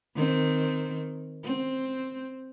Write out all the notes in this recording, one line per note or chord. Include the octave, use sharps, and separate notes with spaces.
D#3 C4
C4